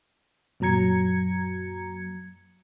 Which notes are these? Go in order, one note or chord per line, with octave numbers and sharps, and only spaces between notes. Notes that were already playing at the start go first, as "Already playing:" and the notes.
F#2 A#2 F#3 A#5 G#6 C#7